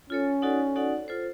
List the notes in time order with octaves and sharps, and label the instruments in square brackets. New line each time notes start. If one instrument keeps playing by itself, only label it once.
[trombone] C#4 [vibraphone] F4 A4 C#5
[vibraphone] D#4 F#4 A4 D5 F#5
D#4 F#4 A4 D5 F#5
F4 A4 C5